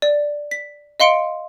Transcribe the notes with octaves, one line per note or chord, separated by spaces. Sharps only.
D5
B6
D#5 F5 C6 C#7 D7